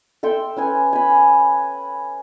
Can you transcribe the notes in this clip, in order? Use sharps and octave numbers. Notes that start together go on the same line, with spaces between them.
A4 E5 G5 C6
C#4 B4 G#5 E6
G#5 B5